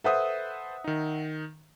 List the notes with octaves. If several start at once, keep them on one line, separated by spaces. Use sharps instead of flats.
A4 B4 C5 E5 F#5 D#6
D#3 D#4